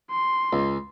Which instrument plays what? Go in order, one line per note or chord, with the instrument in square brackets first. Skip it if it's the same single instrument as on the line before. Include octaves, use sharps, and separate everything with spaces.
[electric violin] C6
[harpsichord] C#2